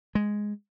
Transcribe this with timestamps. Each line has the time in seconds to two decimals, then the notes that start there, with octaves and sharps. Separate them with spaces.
0.15 G#3